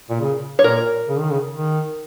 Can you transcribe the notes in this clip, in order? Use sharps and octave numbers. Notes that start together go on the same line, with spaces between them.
A#2
C#3
C#5
A#2 A#4
C#3
D#3
C#3
D#3